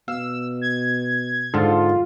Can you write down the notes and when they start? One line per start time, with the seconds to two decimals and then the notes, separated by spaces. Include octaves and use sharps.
0.08 B2 F5 E6
0.62 G#6
1.54 G#2 D3 F4 A4